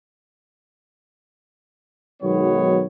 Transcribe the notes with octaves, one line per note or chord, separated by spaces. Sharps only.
B1 D#3 F#3 G#3 B3 C#5